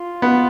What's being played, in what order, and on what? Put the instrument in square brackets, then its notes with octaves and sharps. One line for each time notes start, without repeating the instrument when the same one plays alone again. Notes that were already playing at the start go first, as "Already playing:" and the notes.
Already playing: [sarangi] F4
[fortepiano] B3